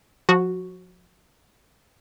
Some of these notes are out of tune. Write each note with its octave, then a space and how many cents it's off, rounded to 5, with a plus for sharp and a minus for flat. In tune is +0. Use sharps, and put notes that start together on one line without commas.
F3 +40 F#4 +0